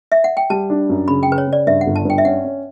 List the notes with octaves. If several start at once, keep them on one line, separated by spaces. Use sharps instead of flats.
E5
F#5
G5
G3 A5
D4
F#2
C#3 B5
G5
C#3 B4
C#5
C#3
D5
G2 E5
F#5
G1
A5
G2 G5
E5
C#4 F#5
C#4